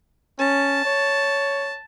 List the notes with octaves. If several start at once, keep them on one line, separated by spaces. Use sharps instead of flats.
C#4 A5
C#5